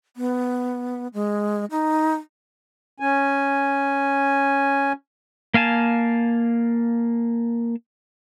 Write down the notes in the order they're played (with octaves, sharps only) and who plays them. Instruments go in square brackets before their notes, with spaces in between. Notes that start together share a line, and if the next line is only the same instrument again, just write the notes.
[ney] B3
G#3
D#4
[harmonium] C#4 G#5
[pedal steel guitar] A#3 F5 G#5 A5